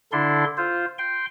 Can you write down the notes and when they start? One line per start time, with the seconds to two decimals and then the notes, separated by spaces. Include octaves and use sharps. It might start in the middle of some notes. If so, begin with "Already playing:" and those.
0.12 D3 D4 E4 A4 C6
0.57 F4 C5
0.98 G5 C6